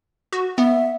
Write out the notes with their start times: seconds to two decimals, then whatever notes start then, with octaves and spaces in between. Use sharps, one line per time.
0.33 F#4
0.58 B3 E5